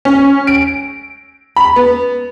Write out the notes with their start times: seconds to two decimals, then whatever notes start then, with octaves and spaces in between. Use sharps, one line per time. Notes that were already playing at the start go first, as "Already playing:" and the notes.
0.05 C#4
0.47 D7
1.56 B5
1.76 B3